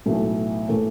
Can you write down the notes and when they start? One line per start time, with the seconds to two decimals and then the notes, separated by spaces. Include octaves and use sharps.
0.06 B1 A2 E3 A3
0.69 A2 E3 A3